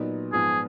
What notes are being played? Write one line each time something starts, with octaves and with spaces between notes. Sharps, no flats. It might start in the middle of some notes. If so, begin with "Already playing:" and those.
Already playing: A#2 F#3 B3 D#4
G#2 F3 B3 F4 G#4